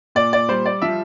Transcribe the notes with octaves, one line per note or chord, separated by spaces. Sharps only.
A#2 D5
D5
G3 C5
D5
F3 E5